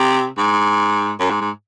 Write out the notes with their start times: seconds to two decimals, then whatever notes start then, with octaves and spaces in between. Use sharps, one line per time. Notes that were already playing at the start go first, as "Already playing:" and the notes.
Already playing: C3
0.38 G#2
1.20 F#2
1.30 G#2
1.41 G#2